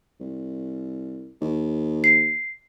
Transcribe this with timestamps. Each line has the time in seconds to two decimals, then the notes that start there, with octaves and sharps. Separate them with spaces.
0.20 C2
1.42 D#2
2.04 C7